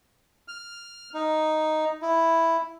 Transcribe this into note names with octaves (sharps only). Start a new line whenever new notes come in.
F6
D#4
E4